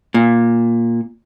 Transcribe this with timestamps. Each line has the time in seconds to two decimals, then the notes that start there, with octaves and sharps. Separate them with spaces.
0.14 A#2